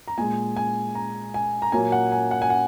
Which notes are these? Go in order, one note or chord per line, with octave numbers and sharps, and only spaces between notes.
A#5
A#2 G#3 G#5
G#5
A#5
G#5
A#5
A#2 F#3 A#3 G#5
F#5
G#5
F#5
G#5
F#5